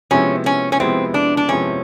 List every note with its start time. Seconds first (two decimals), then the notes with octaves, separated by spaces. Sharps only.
0.11 C3 F3 G#3 B3 C#4 E4
0.46 C#4
0.72 C#4
0.80 C3 F3 G#3 B3 C4 E4
1.14 D4
1.37 D4
1.49 C3 F3 G#3 B3 C#4 E4